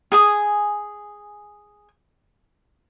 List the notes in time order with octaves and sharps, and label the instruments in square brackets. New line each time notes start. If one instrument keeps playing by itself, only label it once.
[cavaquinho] G#4 G#5 D#6